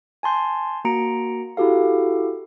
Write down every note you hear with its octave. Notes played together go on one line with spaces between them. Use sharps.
G#5 A5 C6 G6
A#3 F#4 A#5 C#7 D7
E4 F#4 G4 A4 F5